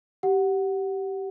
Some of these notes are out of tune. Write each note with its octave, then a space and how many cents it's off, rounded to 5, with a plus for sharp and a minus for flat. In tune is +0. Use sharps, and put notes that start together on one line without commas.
G4 -15 F#5 +0